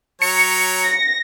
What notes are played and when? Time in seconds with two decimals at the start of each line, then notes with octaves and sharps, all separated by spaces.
0.22 F#3 C#5 A#5 C#7
0.84 A#6